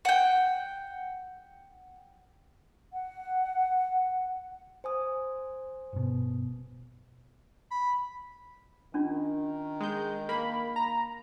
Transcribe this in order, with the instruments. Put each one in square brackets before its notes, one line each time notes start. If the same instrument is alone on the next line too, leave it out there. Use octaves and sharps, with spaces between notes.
[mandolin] F#5 G5
[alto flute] F#5
[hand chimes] C5 G#5 D#6
[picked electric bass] G1 B2
[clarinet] B5
[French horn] D#3 [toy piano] C#4 D4 F4
[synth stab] G#3 G6
[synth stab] A#3 [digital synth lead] B5
[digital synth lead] A#5